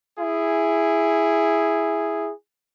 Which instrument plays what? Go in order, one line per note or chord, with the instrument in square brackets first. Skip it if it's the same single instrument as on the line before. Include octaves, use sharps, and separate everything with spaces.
[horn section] E4 G#4